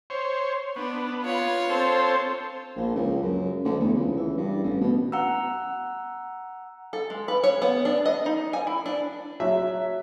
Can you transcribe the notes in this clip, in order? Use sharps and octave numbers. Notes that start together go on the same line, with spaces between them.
C5 C#5
B3 D4
F4 C#5
C4 A4 C5
A#1
C#2
F#2
D2
E2
C#2
E3
G2
A1
B2
F#5 A#5 E6
A4
G#3
B4
C#5
B3
D4
D#5
D#4
G#5
E4
D4
F#3 E5